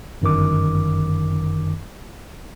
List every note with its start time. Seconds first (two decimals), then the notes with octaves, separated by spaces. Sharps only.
0.22 G1 F#2 D#3 D6